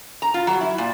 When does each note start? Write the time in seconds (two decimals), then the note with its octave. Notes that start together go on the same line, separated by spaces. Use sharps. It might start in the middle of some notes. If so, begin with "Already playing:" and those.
0.22 A#5
0.34 F4
0.47 F#3
0.61 E4
0.78 A#2